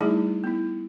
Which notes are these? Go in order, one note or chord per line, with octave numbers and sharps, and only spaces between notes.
G3 A3 D#4 E4 G#4
B3 E4